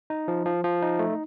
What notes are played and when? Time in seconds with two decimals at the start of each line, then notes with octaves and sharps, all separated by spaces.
0.10 D#4
0.28 F3
0.46 F3
0.64 F3
0.82 D#4
0.99 A3